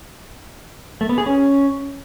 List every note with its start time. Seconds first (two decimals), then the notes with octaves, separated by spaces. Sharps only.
1.01 A3
1.09 B3
1.18 G#4
1.26 C#4